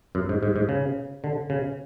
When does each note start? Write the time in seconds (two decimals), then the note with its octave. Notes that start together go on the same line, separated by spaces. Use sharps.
0.15 F#2
0.29 G#2
0.43 G#2
0.56 G#2
0.69 C#3
1.24 D3
1.50 C#3